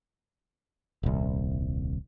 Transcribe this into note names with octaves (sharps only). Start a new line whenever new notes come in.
D#1 C2